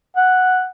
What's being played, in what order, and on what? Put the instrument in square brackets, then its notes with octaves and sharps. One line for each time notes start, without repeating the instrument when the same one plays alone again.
[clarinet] F#5